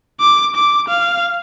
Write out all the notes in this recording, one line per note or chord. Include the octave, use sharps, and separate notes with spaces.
D6
D6
F5